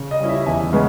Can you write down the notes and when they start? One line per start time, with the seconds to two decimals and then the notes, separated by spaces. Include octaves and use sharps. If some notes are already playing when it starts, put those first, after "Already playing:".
Already playing: C#3
0.11 D#5
0.20 G3 C#4 E4
0.29 E5
0.46 E2 E5 G#5
0.73 C#3 G#3 B3